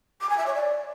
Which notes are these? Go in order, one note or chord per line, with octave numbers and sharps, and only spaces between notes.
D6
G#5
E5
C#5
D5